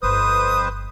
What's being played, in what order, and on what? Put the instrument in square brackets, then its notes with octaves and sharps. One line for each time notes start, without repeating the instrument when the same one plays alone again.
[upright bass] G1 [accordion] F2 B4 C5 [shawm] D#6